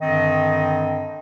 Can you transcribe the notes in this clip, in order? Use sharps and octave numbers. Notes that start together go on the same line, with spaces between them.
G2 D3 D#3 C4 D#5